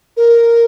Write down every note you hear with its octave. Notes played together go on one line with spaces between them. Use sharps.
A#4